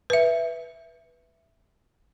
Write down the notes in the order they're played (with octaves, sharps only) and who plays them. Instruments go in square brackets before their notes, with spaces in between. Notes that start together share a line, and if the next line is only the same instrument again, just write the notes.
[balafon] B4 E5